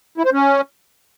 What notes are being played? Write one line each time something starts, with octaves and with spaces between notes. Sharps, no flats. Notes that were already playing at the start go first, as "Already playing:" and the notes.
E4
C5
C#4